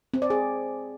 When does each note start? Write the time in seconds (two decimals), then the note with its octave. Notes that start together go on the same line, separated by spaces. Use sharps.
0.14 C4
0.22 D5
0.30 G#4